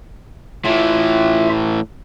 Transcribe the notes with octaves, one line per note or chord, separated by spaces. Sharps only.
A2 E3 F4 E5